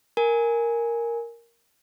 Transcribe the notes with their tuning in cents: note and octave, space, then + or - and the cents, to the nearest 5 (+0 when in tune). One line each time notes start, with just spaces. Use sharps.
A#4 +0 G#5 +0